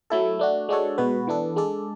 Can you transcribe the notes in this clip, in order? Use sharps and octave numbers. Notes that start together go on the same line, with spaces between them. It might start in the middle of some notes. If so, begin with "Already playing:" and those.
F#3 A3 E4 A4
A3 D4 F#4
G#3 D4 F#4 A4 C#5
B2 G#3 B3 F#4 B4
E3 B3 D4 A4
G#3 D4 A4 D5